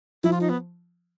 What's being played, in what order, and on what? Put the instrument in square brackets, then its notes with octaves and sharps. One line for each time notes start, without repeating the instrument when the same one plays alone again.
[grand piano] F3 [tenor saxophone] E4
[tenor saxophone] F4
D#4
B3